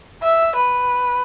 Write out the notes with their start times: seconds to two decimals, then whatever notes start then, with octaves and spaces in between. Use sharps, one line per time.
0.23 E5
0.56 B4